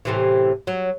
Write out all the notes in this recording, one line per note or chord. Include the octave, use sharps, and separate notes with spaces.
A2 C3 E3
F#3